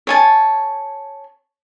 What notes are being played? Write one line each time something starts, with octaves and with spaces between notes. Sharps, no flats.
C#5 G#5 A5